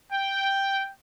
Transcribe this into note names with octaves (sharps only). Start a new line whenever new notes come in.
G5